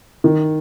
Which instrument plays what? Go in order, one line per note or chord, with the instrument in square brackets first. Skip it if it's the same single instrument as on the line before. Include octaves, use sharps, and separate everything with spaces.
[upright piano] D#3